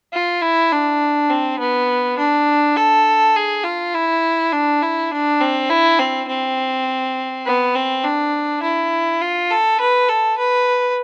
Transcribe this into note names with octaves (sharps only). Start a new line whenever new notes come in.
F4
E4
D4
C4
B3
D4
A4
G#4
F4
E4
D4
E4
D4
C4
E4
C4
C4
B3
C4
D4
E4
F4
A4
B4
A4
B4